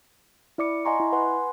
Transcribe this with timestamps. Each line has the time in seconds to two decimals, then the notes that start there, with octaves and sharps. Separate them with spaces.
0.58 E4 D5 D6 C#7
0.85 D#5 F#5 G#5 A#5 C6 C#6
1.00 E4
1.12 B4 F#5 G#5 C6